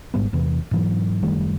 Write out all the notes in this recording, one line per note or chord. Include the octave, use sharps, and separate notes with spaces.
G#1 G#2 G3 B3
E2 C3 E3
G#2 E3 F#3
F#1 D#3 G3 A3